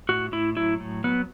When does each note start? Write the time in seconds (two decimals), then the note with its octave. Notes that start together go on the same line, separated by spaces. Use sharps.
0.09 A2 F#4
0.32 A2 E4
0.57 F#3 E4
0.80 A2
1.04 F#3 B3